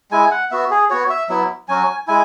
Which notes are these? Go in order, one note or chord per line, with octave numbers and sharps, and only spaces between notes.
G#3 E4 G#5
F#5
B3 F#4 E5
G#4
B3 F#4 C#5
E5
F#3 B3 E4 E5
F#3 C#4 F#4 G#5
G#3 E4 G#5